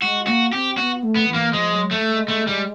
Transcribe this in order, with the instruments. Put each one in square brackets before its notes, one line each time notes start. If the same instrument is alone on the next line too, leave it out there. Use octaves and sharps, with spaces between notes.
[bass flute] G#3 [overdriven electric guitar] F#4
[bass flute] A#3 [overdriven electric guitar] F#4
[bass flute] C4 [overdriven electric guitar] G4
[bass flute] B3 [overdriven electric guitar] F#4
[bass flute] A3
[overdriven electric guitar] B3
[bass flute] E3
[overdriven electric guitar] A#3
[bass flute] F3 [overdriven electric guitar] G#3
[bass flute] F#3
[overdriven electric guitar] A3
[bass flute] G#3
[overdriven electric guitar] A3
G3